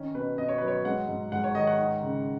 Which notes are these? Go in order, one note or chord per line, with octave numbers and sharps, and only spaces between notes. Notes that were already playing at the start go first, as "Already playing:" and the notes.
Already playing: D#3 C#4
B2 B4
B2 D#5
C#5
F#3 B4
C#5
G#3 F#5
G#2
G#2 F#5
C#5
D#3 D#5
F#5
D#4
C#3